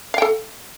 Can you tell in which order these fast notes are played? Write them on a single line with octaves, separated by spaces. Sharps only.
F5 G5 A4